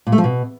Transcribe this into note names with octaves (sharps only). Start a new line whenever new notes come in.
A#2
A3
F3
B2